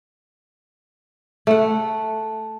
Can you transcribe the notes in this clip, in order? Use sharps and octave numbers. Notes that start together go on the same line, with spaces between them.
A3 F#5